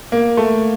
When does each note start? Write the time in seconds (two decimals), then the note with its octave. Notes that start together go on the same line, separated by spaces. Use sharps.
0.12 A#3
0.37 A3